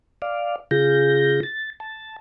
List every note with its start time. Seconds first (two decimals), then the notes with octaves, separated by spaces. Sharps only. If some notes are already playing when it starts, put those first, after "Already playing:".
0.22 D5 F5
0.71 C#3 F4 G#4 G6 A#6
1.43 A6
1.80 A5